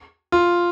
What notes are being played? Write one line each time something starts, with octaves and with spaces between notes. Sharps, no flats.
F4